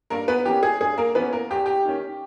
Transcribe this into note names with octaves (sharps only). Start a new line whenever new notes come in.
G2 A#3 A#4
B3 B4
E3 A#3 C#4 G4
G#4
G2 G#4
A#3 A#4
E3 A#3 B3 C#4 B4
A#3 A#4
E2 G4
G4
D#3 A#3 C#4